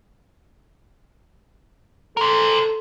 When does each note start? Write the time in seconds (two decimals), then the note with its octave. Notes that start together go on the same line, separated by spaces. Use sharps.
2.17 A4 A#4 C5